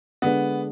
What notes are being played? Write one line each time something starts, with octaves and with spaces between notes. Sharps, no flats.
D3 G#3 B3 D4